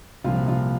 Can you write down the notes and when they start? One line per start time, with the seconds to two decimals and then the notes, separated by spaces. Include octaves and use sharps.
0.24 C2 A#2 F3 F4
0.48 F4